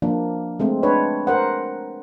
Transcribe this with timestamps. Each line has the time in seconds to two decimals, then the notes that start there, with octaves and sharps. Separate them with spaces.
0.02 F3 A#3 D4
0.60 G#3 A3 C4
0.83 D4 B4 C#5
1.27 A#4 C5 F#5